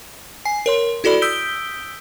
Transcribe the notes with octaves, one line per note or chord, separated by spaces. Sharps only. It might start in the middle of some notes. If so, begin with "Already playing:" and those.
G#5 C7
A#4 C#5 C6
E4 F#4 A4 D5 B5
D#6 E6 G6 B6 D7 G7